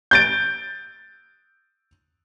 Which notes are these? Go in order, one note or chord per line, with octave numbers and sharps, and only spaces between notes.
G6 A6 D7